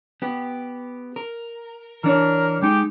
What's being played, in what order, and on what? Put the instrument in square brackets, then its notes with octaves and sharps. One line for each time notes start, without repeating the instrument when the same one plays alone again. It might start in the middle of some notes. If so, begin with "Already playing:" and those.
[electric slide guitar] B3 G4
A#4
[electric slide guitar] E3 D4 C#5 [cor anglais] A#4
[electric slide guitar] G#3 D#4 [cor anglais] G4